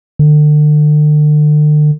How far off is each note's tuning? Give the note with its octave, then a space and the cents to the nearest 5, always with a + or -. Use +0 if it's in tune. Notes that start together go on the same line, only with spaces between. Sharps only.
D3 +40